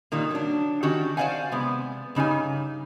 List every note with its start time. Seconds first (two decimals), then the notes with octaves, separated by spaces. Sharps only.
0.12 A#2 D#3 G3 A#3
0.30 F#3 D4
0.83 D#3 C#4 F#4 G4
1.17 C5 D5 D#5 F5 F#5 G#5
1.52 C3 G#3 B3
2.15 G2 C#3 D#4 G4 G#5